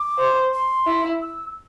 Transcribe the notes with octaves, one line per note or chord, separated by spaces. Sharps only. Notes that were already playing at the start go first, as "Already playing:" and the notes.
Already playing: D6
C5
C6
E4
E6